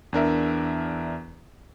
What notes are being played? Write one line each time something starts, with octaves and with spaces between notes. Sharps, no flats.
E2 D4 A#4 E5